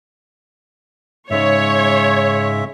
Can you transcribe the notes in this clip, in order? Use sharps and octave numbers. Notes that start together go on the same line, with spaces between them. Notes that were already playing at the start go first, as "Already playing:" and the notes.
G#2 C#3 G#3 C#5 E5